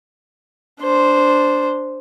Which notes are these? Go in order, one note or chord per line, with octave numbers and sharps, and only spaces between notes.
D4 C5